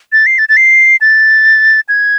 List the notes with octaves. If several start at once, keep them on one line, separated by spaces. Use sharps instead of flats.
A6
C7
A6
A6
C7
A6
G#6